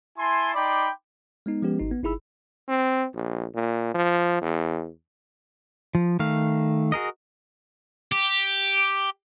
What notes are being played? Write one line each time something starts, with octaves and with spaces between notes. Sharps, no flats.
E4 G#5 A5 C6
D#4 D5 G5 B5 C6 D6
G#3 B3 D#4
F3 G#3 B3 C#4 G4 B4
G#1 D#4
B3
G1 D#4 E4 G#4 B5 E6
C4
A#1
A#2
F3
E2
F3
D#3 A3 F5
F#4 G#4 A#4 D#5
G4